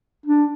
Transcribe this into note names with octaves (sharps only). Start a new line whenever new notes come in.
D4